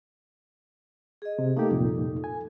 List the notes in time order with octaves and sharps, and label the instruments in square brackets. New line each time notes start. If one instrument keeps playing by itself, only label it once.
[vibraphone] G#4 D#5
[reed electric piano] C3
[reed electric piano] A3 A#3 G4 [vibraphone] D#4 A4
[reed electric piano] C2 F2 A#2
G#5